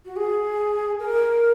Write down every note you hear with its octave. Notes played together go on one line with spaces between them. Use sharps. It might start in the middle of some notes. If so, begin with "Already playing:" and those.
F#4
G#4
A#4